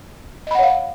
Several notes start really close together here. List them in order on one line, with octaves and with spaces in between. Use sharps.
D#5 B5 F#5 C#5 F5